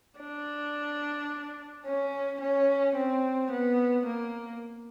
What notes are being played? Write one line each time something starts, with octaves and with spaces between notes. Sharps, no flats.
D4
C#4
C#4
C4
B3
A#3